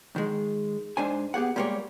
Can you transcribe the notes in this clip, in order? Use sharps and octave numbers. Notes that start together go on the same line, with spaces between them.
D#3 G#3
G#2 D4 C5 G#5
B3 G4 G#4 F#5
G3 G#3 A#3 G4 C#5